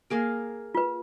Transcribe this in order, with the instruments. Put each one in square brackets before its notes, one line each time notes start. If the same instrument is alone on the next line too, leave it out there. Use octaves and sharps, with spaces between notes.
[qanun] A#3 G#4 A#4
[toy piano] F4 B4